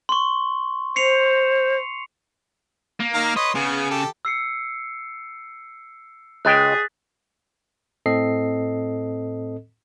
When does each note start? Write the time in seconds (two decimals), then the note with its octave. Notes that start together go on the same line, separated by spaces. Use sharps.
0.09 C6 C#6
0.96 C5 C7 C#7 F7
3.00 A#3
3.14 D#3 F5 A#5
3.36 B4 C#5 D#5 C6
3.55 C#3 B3 G#4
3.91 G4 A4
4.25 E6 C7 C#7
6.45 C#2 G#3 G#4 G5 F#6 A6 B6
8.06 A2 C4 A4 D#5 C7